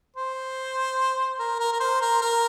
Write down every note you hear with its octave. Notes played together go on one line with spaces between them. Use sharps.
C5
A#4
A#4
A#4
C5
A#4
A#4